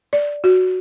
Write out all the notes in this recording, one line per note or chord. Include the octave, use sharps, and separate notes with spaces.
D5
F#4